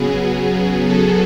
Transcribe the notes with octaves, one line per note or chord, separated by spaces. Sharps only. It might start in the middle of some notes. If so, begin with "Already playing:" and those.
Already playing: C#3 F#3 B3 G#4
A4